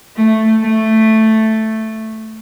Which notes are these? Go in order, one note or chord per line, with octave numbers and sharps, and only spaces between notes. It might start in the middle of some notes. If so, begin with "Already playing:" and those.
A3
A3